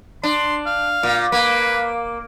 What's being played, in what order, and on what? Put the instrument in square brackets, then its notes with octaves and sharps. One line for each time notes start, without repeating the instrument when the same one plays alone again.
[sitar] D4 [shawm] C6
[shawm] F5
[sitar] A#2
[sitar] A#3 [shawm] B4